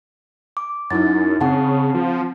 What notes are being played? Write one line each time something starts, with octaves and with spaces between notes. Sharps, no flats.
D6
F#2 D#4 E4 A6
C#3 C4 F#5 A5
F3